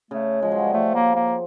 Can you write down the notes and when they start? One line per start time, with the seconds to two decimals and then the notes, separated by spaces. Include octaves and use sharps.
0.11 C#3 A3
0.42 F3 G#3
0.51 F#3
0.58 G3
0.74 F3 A3
0.95 A#3
1.16 A#3